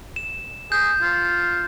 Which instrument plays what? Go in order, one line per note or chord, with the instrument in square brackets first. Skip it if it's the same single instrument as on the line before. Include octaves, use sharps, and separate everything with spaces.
[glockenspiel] E7
[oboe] G#4 [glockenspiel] G6
[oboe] F4